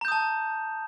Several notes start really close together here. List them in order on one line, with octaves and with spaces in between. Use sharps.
A#5 G6 D#6 A5